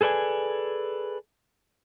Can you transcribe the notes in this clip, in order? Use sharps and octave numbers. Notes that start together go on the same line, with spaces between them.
G#4 A4 B4 D5 G#5